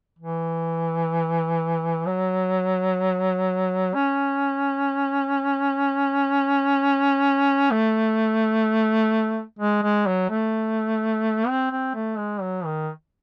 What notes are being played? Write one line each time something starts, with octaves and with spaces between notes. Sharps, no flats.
E3
F#3
C#4
A3
G#3
G#3
F#3
A3
C4
C4
A3
G#3
F#3
D#3